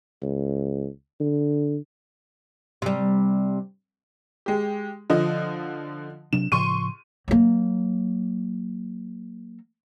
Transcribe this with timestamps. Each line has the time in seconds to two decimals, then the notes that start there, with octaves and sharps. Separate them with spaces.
0.23 C#2
1.20 D3
2.82 C3 G3
4.46 G#3 G4
5.10 D3 F3 D#5
6.33 C3 F#3 D4 E7
6.52 A2 C#3 F3 C6 C#6 D#7
7.28 F#3 A#3